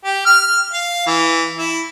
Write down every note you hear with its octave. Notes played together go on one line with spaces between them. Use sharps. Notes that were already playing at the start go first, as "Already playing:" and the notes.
G4
F6
F5
E3
E4